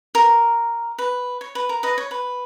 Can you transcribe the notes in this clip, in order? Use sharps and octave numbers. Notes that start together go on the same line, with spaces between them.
A#4
B4
C#5
B4
A#4
B4 D#5
C#5
B4